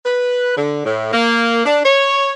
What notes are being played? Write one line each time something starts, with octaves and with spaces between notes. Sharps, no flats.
B4
D3
A2
A#3
D4
C#5